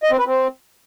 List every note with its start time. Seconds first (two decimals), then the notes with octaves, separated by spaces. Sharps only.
0.03 D#5
0.11 C4
0.19 B4
0.27 C4